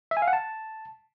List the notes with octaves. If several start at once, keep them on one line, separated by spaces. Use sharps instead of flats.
E5
G#5
F5
F#5
A5